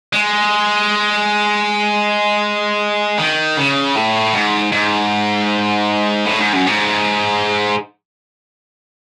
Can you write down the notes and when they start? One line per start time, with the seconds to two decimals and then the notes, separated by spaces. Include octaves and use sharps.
0.13 G#3
3.19 D#3
3.57 C#3
3.96 A2
4.34 G#2
4.72 G#2
6.26 A2
6.40 G#2
6.53 F#2
6.67 G#2